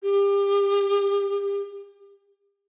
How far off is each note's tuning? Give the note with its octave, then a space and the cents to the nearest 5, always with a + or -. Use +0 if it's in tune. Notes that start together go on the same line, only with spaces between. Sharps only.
G4 +35